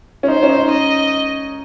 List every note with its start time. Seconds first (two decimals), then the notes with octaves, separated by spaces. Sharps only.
0.23 C#4
0.28 D#4 C5
0.43 C#4
0.49 D#4
0.71 D#5